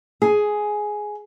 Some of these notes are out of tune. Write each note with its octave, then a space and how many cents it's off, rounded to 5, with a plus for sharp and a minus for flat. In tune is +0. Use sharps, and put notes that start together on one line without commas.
G#4 +10